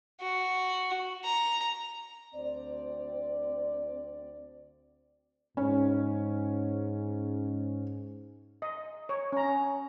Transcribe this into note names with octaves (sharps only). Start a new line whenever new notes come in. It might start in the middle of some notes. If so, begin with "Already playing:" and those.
F#4
A#5
D2 C4 C5 D5
G#2 C#4
D#5
C#5
C#4 A#5